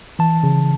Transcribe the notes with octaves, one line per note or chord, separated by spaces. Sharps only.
E3 A5
C#3